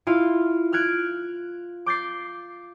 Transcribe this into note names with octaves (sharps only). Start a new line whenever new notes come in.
E4 F4 F5
F6 F#6 G#6 D7
D6 G6 A6 C7